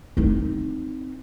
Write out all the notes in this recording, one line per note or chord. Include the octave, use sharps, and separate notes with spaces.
C4 D#4